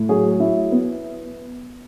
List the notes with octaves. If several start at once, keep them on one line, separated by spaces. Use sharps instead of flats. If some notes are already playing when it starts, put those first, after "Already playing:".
Already playing: A2
F#3 G#4
E4
B3